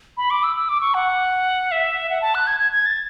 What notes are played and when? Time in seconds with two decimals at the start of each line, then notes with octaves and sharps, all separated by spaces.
0.17 B5
0.30 D6
0.43 E6
0.56 E6
0.69 D6
0.81 C#6
0.94 F#5
1.72 E5
2.10 F#5
2.22 A5
2.35 F#6
2.47 G#6
2.60 G#6
2.73 G#6
2.86 A6